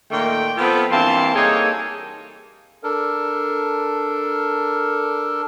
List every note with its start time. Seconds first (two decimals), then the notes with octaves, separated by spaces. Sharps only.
0.11 A#2 D#3 A3 A#3 G5
0.57 F3 B3 C4 F4 A4
0.91 G2 E3 A#3 C4 A5 C6
1.35 G3 A#3 D#4 G#4 A4 C#5
2.84 D4 A4 A#4